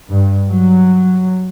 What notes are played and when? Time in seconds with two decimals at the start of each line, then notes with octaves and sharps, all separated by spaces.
0.11 G2
0.47 F#3